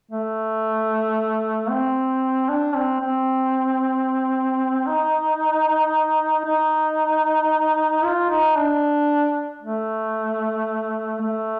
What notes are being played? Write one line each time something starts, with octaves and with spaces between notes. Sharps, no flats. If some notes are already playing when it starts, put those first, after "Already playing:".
A3
C4
D4
C4
C4
D#4
D#4
F4
D#4
D4
A3
A3